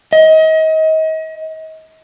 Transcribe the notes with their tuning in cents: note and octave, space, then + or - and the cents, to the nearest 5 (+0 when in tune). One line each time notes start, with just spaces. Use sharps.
D#5 +30